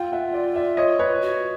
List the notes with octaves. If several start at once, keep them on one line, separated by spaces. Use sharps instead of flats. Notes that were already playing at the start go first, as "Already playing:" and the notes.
Already playing: F4 F5 G5
E5 F#5
D5 E5
D5 E5
C#5 D#5
B4 C#5
F#4